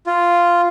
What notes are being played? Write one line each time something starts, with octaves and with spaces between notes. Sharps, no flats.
F4